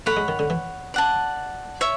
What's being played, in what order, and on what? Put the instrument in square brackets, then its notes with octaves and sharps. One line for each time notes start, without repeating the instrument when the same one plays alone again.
[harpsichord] A3 [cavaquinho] C#5 F#5 B5
[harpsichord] G#3
D#3
D3
E3
[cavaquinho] D5 F#5 A5
C#5 E5